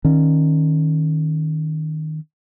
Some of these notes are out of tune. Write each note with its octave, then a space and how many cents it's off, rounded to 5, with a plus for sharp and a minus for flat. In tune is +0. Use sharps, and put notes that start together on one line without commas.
D#3 +0 C#4 -20